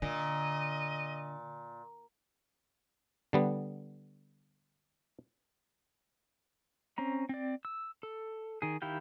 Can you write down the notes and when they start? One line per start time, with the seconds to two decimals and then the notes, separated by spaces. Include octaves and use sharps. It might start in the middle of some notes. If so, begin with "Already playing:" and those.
0.02 A#2 D3 D#5
3.33 D3 G3 B3
6.98 C4 C#4 A#5
7.29 C4 D5
7.65 E6
8.03 A4
8.62 D#3 G#4
8.82 D#3 E4 G4 F5 G5